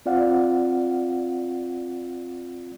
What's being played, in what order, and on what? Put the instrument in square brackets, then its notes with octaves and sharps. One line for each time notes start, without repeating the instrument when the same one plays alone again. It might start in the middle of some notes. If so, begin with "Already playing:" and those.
[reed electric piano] C4 F4 D5 F5 F#5